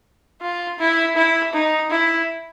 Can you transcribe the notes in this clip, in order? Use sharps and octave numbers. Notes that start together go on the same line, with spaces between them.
F4
E4
E4
D#4
E4